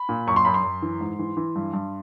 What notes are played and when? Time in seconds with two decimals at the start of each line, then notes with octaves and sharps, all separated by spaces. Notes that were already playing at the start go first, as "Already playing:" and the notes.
Already playing: B5
0.09 A#2
0.27 F#2 C#6
0.36 C6
0.45 F#2 B5
0.54 C6
0.64 F#2
0.82 E3
1.01 G#2
1.19 E3
1.37 E3
1.56 G2
1.73 G2